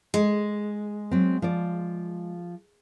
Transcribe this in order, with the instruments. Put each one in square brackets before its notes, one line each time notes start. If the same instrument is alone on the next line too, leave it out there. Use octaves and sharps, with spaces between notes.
[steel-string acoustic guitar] G#3
[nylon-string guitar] F#3 C4
F3 D5